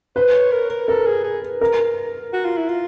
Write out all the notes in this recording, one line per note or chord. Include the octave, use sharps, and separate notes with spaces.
B4 C5
C#5
A#4
A#4
A4 A#4
G#4
G#4
A#4
F#4
F4
E4
F4